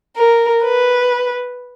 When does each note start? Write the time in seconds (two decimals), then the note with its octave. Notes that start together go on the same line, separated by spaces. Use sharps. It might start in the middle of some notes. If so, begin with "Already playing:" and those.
0.17 A#4
0.64 B4